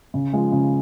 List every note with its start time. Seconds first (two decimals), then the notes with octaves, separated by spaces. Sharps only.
0.14 C#3
0.33 F3 G#3
0.52 C#3